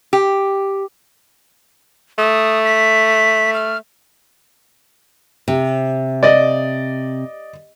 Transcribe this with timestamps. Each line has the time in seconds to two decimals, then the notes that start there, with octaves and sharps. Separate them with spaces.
0.13 G4
2.18 A3 D#6
2.65 B6
3.54 F6
5.48 C3
6.23 D5 D#5